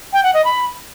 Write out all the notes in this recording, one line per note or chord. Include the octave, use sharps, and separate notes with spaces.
G5
F#5
D#5
B5